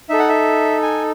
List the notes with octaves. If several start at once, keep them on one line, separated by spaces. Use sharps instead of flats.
D#4 A4 E5
F#5
E5
G#5